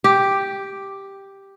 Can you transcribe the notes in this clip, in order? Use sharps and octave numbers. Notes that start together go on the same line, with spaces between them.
G4